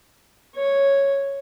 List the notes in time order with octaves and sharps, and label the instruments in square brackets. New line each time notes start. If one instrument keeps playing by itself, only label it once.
[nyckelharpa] C#5